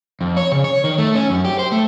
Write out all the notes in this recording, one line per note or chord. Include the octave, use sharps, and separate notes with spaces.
F2
C#5
C#3
C#5
D#3
A3
C#4
F#2
G4
C5
A3